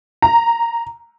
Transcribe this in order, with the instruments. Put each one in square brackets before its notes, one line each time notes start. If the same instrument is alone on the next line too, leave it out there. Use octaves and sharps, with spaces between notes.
[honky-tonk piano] A#5